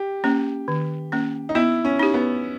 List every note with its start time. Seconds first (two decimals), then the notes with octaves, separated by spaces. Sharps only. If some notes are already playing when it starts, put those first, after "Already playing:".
Already playing: G4
0.24 A#3 C#4
0.68 D#3
1.12 A#3 C#4
1.49 D#4
1.55 B3 E4
1.85 C#4
1.99 D#4 G4
2.14 B3